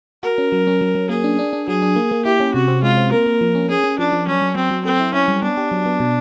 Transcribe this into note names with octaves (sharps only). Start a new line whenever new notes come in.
F#4 A#4
C#4
F#3
C#4
F#3
F#3
A#3 G#4
D4
D4
D4
F#3 G#4
D4
A#3
A#3
E4 G4
C#4
C3 F#4
C4
G#3 F4
C4
A#3 A#4
A#3
F3
C#4
C#4 G#4
C#4
F3 D4
F3
F#3 C#4
F#3
F#3 C4
F#3
C4 A4
E4
C#4 E4
G3
B3 D4
G4
F#3
B3
B2